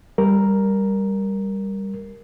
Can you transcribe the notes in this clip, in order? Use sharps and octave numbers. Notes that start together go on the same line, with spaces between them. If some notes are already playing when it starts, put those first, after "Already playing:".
G3 A#4